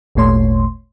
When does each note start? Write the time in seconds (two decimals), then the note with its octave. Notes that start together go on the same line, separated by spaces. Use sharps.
0.15 G#1 D#2 A#2 A3 C#5 C6